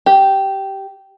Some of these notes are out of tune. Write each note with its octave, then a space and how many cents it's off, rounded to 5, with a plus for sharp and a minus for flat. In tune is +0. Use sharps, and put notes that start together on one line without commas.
G4 -10